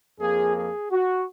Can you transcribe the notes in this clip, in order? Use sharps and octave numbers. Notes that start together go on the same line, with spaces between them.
F2 F3 A#3 G#4
G#4
F#4